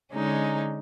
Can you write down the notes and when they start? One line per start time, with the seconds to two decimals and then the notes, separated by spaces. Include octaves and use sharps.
0.12 D3 G#3 C#4 D#4